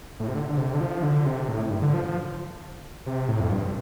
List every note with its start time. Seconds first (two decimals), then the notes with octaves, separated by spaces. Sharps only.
0.20 A2
0.28 C3
0.35 D3
0.49 D3
0.58 C3
0.74 D3
0.81 F3
1.03 D3
1.26 C3
1.48 A2
1.67 A2
1.71 G2
1.82 D3
1.94 F3
2.05 F3
3.06 C3
3.28 A2
3.40 F2
3.51 G2